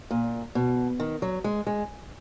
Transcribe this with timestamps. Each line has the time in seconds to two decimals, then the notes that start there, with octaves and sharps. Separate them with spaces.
0.11 A#2
0.55 B2
1.00 D#3
1.22 F#3
1.44 G#3
1.67 G#3